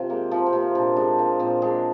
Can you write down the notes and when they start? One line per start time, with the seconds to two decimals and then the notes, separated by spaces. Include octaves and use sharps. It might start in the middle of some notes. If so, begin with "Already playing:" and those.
Already playing: C3 F3 C4 F4
0.10 G#3 A#3
0.31 F3
0.46 C4
0.53 C3 A#3
0.61 C4
0.75 A#2 D4
0.96 G#3 D4
1.19 F3 A#3
1.39 A#2 C4
1.62 G#3 D4